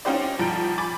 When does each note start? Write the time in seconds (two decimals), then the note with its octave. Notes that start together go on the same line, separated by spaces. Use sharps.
0.05 C#4 D#4 F4 G4 C5 D5
0.39 B1 F3 G3 A#5 G6 D7
0.78 G#5 B5 D6 A6